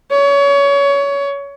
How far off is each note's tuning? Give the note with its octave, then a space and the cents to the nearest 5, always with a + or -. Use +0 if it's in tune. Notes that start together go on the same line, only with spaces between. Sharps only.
C#5 +25